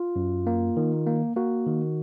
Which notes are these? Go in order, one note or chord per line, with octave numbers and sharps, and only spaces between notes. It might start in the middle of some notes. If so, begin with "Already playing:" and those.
Already playing: F4
F#2
A#3
D#3
A#3
A#3 F#4
D#3